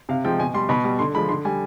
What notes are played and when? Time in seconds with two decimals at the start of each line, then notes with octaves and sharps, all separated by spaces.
0.09 C3 F5
0.24 F3 G#3 G5
0.40 B2 G#5
0.54 G3 C6
0.69 B2 B5
0.84 G3
0.99 D3 C6
1.14 F3 G#3 B5
1.29 D3 C6
1.45 G3 G#5